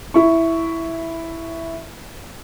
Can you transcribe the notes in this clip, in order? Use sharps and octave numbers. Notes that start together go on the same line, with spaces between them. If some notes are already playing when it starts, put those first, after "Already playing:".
E4 C#6